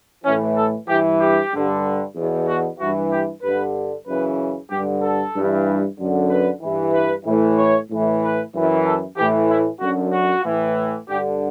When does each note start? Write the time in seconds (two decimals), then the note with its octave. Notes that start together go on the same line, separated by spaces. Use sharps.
0.25 A2 E3 C#4
0.56 A4
0.88 G2 E3 G4
1.20 G4
1.52 G2 D3
2.15 E2 B2
2.48 F#4
2.79 G2 E3 F#4
3.11 G4
3.43 G2 D3 B4
4.06 F#2 C#3 E3 B4
4.71 G2 D3 G4
5.03 A4
5.34 G2 E3
5.98 F#2 D3
6.30 B4
6.62 G2 E3
6.94 B4
7.26 A2 E3
7.58 C#5
7.90 A2 E3
8.22 B4
8.54 F#2 E3
8.85 A4
9.17 A2 E3 G4
9.49 E4
9.81 F#2 D3 F#4
10.13 F#4
10.45 A2 E3
11.09 G2 D3 G4